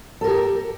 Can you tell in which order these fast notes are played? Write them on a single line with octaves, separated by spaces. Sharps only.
A4 A#4 G4